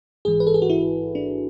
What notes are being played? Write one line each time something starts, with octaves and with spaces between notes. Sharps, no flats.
A1 G#2 E3 G#4
B4
A4
G#4
F#4
E4
D4